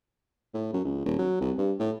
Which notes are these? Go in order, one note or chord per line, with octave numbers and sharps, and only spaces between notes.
A2
F#2
C#2
D#1
F#3
C2
G2
A2